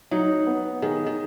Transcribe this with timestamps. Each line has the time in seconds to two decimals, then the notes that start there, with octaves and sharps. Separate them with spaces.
0.11 F#3 D#4
0.47 B3
0.82 D#3 G#4
1.06 D#3